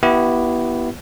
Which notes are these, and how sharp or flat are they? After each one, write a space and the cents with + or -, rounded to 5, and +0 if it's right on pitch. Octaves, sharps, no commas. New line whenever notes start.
B3 -20 E4 +0 G4 -35